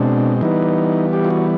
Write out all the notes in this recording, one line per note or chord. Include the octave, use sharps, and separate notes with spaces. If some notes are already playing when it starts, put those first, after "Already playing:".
Already playing: B2 G#3 C4 D4
E3 G3 B3 D#4
G4
F4
F#4